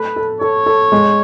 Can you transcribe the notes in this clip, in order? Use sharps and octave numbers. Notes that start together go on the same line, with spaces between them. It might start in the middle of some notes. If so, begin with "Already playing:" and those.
Already playing: A3 A4 B4
A4
A4 C#5
A4
G#3